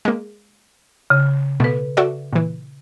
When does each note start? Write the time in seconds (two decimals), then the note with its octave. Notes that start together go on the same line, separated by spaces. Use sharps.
0.05 G#3 A#3
1.10 C#3
1.60 B2 A3 A4 B4
1.97 F#4 A4 D5 E5
2.33 A#2 E3